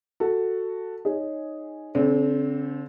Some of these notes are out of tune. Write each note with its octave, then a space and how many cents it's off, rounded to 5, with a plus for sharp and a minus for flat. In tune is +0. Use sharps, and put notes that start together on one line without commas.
F#4 +0 A4 +10
D#4 +0 G#4 +0 C#5 +0
D3 -40 C4 +0